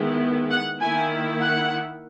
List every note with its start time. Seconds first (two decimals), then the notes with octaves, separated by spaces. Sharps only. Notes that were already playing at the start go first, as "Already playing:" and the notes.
Already playing: D#3 G#3 B3 E4
0.51 F#5
0.80 D#3 A#3 E4 G#5
1.41 F#5